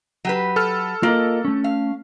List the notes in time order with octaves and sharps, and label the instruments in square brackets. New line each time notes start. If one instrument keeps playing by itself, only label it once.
[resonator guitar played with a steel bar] F#3 G4 B4
[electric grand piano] A4 F6
[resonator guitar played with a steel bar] A#3 [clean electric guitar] F4 A#4 D#5
[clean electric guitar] A3 C#4
[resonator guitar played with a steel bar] F5